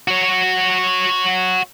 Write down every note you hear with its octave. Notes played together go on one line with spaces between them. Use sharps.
F#4 C#5